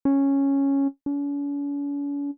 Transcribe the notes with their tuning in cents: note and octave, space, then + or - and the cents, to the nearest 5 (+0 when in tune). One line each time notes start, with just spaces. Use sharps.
C#4 -5
C#4 +45